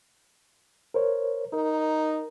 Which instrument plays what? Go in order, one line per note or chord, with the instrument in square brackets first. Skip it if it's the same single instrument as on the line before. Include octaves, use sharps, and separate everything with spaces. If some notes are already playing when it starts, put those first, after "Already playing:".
[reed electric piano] A#4 C5 C#5
[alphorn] D#4 [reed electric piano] A#4